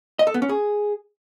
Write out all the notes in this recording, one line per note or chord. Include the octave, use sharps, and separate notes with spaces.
D#5
A4
B3
C#4
G#4